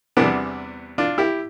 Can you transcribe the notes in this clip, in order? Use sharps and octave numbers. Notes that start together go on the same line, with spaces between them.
E2 C3 E3 G3 B3 D4
D4 F4
E4 G4